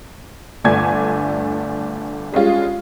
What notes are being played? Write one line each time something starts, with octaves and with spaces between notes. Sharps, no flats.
G1 A3 D4 D5 G#5 G#6
G3 G#3 C#4 F4